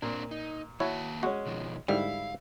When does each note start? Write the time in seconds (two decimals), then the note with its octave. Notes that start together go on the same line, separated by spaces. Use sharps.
0.02 A#2 C4 D4
0.31 D#4
0.80 D#3 A#3 E4 F#4 C#5 A5
1.23 G#3 C#4 F#4
1.46 B2 D#3 F3
1.88 G#2 D3 G3 E4 F5